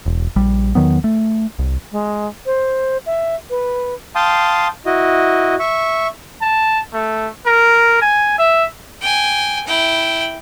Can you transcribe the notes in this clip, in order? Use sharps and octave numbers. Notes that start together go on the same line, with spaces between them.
E1
A#1 G3
E2 D#3 F#3 B3
A3
C2
G#3
C5
E5
B4
F5 G5 A5 C6 D#6
E4 F#4 D#5
E5 C#6
A5
A3
A#4
G#5
E5
G5 G#5
E4 G5